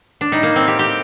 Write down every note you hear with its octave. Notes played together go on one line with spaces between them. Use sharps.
D4
A2 G3 D#4
A#3
C4
G4
G4